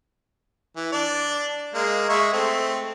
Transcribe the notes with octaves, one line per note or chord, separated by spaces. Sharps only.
E3
D4 D5
G#3 A#3
G#3 E5 C#6
A3 C4